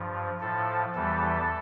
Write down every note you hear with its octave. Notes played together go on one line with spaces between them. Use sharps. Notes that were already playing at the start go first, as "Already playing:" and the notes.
Already playing: G2 F3
A2 F3 A4
E2 E3 G3 A4